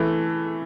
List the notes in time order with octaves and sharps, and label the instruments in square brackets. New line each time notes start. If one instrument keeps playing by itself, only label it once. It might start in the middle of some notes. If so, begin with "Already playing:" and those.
Already playing: [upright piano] E3 A3